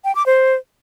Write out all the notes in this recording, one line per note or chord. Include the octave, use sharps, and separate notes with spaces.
G5
D6
C5